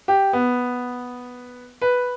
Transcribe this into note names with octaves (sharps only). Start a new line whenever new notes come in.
G4
B3
B4